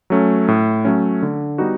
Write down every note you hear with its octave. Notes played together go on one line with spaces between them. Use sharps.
F#3 A3 C#4
A2
F#3 A3 C#4
D3
G3 B3 D#4 F#4